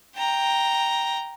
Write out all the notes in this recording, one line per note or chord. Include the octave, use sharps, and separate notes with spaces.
G5 A#5